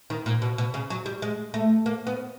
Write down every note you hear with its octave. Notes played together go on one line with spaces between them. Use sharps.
D#3
A#2
B2
B2
C#3
F#3
G3
G#3
A3
A#3
B3